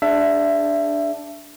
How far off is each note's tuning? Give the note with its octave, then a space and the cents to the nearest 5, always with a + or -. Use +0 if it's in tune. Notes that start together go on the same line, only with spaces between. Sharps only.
D4 +0 G#4 +0 E5 +20